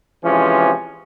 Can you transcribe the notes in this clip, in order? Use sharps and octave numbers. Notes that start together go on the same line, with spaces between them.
C3 E3 F3 G#3 C#4